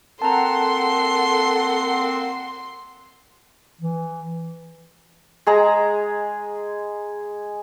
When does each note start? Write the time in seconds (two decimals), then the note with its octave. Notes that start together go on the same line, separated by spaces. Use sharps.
0.22 A#3 C4 A4 F#5 A5 A#5 C6
3.81 E3
5.47 G#3 G#4 A#5